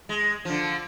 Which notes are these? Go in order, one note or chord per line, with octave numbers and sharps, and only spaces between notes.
G#3
D3 F3